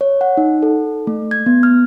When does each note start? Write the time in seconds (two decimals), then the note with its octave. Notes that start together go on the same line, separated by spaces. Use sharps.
0.01 C#5
0.21 F#5
0.37 D#4
0.62 A4
1.07 A3
1.31 G#6
1.46 B3
1.63 F6